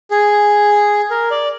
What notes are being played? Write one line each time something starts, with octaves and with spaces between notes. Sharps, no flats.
G#4
A#4
D5